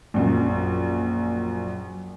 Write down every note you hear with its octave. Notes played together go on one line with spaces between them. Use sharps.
A#1 F#2